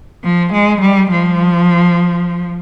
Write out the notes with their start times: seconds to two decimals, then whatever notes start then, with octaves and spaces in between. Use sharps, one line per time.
0.24 F3
0.53 G#3
0.81 G3
1.11 F3